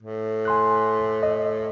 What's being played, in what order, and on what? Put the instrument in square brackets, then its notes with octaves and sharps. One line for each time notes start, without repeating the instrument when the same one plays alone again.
[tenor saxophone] A2
[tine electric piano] G#5 C6 F#6
D#5